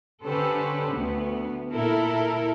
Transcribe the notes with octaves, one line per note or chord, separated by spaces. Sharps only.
D3 C#4 G4 A4 B4 C5
D2 B3
A#2 E4 A4 A#4